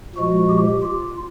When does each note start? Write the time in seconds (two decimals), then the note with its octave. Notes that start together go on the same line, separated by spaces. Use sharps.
0.16 A#2 F3 G#3 F#4
0.49 G4
0.83 F4